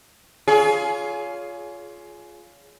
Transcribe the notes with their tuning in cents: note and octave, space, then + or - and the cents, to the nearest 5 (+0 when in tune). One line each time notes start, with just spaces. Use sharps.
F4 +0 G#4 +20 C#5 +35